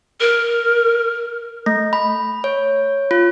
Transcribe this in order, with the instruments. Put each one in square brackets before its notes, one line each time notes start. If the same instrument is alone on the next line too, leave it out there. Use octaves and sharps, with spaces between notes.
[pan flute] A#4
[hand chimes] A3
B5
C#5
F4